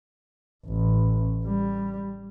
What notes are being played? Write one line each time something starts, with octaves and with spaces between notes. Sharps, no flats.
A1
G3